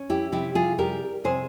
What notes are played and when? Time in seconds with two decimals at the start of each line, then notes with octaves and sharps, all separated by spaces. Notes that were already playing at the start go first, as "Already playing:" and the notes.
Already playing: C#4
0.10 E4 G4
0.32 C3 E4 G4
0.55 F4 G#4
0.78 G3 G4 A#4
1.24 C3 G#4 C5